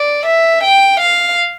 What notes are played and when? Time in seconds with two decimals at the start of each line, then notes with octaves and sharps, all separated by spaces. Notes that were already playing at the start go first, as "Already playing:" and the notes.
Already playing: D5
0.26 E5
0.63 G5
1.00 F5